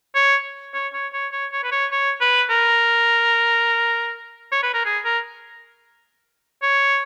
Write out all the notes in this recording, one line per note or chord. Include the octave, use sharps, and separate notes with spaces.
C#5
C#5
C#5
C#5
C#5
C#5
B4
C#5
C#5
B4
A#4
C#5
B4
A#4
G#4
A#4
C#5